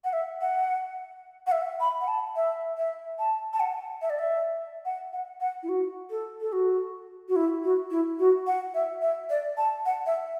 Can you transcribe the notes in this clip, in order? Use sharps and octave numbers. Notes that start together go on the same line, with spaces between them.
F#5
E5
F#5
F#5
E5
B5
F#5
A5
E5
E5
A5
A5
F#5
E5
D5
E5
F#5
F#5
F#5
E4
F#4
A4
A4
F#4
F#4
E4
F#4
E4
F#4
F#5
E5
E5
D5
A5
F#5
E5